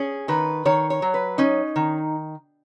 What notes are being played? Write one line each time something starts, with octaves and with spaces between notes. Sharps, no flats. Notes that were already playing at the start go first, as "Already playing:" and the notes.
Already playing: C#4 G#4
D#3 B4
D#3 C#5
C#5
F#3
B4
C#4 D#4
D#3